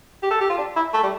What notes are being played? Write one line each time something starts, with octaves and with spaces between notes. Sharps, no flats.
G4
A4
G4
F4
D4
E4
A3
G3